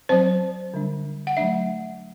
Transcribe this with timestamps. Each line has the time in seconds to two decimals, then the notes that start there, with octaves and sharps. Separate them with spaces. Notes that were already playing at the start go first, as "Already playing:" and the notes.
0.09 F#3 C4 C5
0.74 D3 G3 D4
1.27 F#5
1.37 F#3 A3 D4 E5